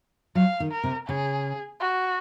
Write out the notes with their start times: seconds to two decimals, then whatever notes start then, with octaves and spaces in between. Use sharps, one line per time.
0.35 F#3 F5
0.60 D#3
0.71 A#4
0.84 C3
1.07 C#3 G#4
1.80 F#4